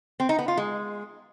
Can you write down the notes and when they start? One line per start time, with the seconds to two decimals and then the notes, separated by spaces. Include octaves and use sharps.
0.20 C4
0.29 D#4
0.39 B3
0.48 F4
0.57 G#3